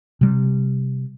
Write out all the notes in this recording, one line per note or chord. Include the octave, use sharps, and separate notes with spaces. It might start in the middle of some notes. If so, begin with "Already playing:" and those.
C3 G3